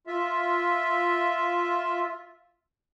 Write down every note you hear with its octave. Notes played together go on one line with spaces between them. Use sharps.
F4 E5